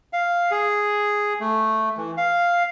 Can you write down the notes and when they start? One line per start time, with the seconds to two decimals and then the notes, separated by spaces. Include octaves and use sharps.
0.13 F5
0.51 G#4
1.40 A3
1.97 E3
2.17 F5